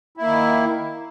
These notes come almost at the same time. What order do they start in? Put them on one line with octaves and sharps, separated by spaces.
E4 A#3 D#3